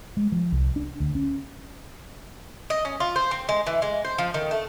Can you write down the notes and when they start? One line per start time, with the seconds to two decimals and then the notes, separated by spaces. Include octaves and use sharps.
0.17 G#3
0.32 F3
0.52 C2
0.76 D4
1.00 D2
1.15 C#4
2.70 D#5
2.85 C#4
3.00 F4
3.16 C5
3.31 C4
3.49 G#3
3.67 E3
3.82 G#3
4.05 C5
4.18 F3
4.34 D#3
4.51 A3